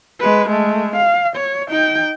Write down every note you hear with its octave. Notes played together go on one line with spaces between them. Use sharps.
G#3 B4
G#3 A3
F5
C#5
D#4 G5